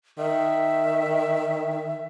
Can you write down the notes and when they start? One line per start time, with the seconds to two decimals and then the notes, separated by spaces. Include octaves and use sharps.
0.18 D#3 E5